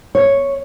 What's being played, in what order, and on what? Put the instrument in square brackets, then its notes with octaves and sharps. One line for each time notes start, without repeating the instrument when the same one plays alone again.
[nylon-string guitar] C#5